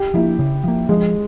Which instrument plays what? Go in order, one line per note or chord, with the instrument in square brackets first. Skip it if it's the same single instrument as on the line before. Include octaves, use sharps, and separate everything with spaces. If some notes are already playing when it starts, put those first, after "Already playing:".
Already playing: [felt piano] G4
[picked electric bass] F3 A#3 [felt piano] E4
[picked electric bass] C#3
F3 A#3
[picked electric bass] F3 [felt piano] G#3